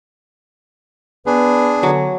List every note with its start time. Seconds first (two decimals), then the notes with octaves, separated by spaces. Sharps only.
1.26 B3 D4 G#4 B4
1.83 D3 F#3